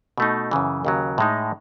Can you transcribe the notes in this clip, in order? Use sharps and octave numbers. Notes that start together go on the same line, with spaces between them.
B2 A3 D#4
F#2 C#3 E3
D#2 C#3 F#3
A2 G#3 D#4